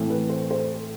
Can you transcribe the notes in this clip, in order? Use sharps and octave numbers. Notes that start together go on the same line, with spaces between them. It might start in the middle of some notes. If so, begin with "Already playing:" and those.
Already playing: A2 E3 A3 C4
B4
C5
C5